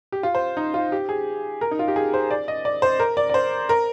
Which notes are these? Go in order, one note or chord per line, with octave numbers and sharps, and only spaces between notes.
G4
F4
C5
D#4
F4
G4
G#4
A#4
D#4
F4
G4
G#4
C5
D5
D#5
D5
C5
A#4
D5
D5
C5
A#4